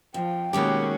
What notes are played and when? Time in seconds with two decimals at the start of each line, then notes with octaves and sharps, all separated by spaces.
0.14 F2 F3 G5
0.53 B2 D#3 G#3 A#3 C#4 F#4 G4 A#4